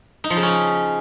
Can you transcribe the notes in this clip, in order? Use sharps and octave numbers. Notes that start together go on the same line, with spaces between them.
D#4
F3
C#3
C#4